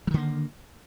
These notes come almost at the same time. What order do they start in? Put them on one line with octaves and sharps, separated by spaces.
F#3 D#3 D3 A#3